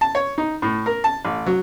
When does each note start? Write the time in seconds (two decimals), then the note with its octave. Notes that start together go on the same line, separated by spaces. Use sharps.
0.01 A5
0.15 C#5
0.38 D#4
0.62 A2
0.86 A#4
1.04 A5
1.25 A1
1.46 F#3